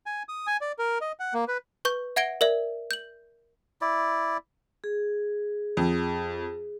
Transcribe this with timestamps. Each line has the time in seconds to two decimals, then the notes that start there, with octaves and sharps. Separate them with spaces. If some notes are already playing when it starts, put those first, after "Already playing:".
0.06 G#5
0.29 D#6
0.47 G#5
0.61 D5
0.79 A#4
1.01 D#5
1.20 F#5
1.34 A#3
1.48 B4
1.85 B4 C#6 G6
2.16 E5 F#5 G#6 A#6 D7 G7
2.41 A#4 D5 E5
2.91 G6 F#7
3.81 E4 D5
4.84 G#4
5.77 F2